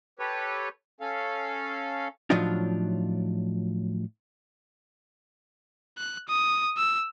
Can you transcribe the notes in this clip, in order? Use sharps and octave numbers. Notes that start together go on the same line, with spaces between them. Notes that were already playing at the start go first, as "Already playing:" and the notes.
G4 A4 B4 C#5
C#4 A4 F5
A2 F3 F#3 D4 D#4 F4
F#6
D#6
E6